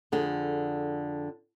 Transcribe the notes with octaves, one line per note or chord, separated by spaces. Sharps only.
F2 D3 G#4